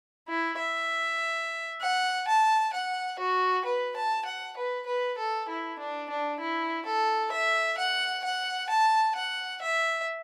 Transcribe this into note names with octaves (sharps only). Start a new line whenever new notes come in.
E4
E5
F#5
A5
F#5
F#4
B4
A5
F#5
B4
B4
A4
E4
D4
D4
E4
A4
E5
F#5
F#5
A5
F#5
E5